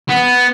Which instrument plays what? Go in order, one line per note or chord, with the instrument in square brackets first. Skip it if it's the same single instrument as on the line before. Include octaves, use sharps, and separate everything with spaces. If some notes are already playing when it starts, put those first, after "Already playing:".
[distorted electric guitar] B3